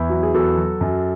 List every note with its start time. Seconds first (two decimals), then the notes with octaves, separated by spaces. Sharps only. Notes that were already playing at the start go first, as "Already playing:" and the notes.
Already playing: E2 E4
0.10 F#3 F#4
0.23 G#4
0.34 E2 F#4 A4
0.58 F#3
0.81 F#2